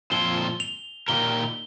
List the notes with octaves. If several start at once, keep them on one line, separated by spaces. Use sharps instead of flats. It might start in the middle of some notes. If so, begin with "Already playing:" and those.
A#2 F3 C4 F4 C5 G7
F7
A#2 A#3 D#4 G4 A#4 G7